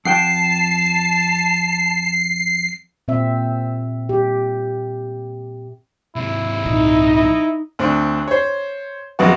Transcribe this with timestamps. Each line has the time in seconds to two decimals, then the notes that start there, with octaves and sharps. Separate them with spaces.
0.05 F2 F#5 G5 A5 C7
3.08 A#2 C4 E5
4.09 G4
6.16 G#2 C3 E4
6.65 C2 A#2 D#4
7.13 E4
7.79 D2 C4 D4
8.28 C5 C#5
9.19 A#1 F2 B3 F#4